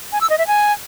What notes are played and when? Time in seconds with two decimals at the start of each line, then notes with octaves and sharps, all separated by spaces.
0.12 G#5
0.21 E6
0.30 D#5
0.38 E5
0.47 G#5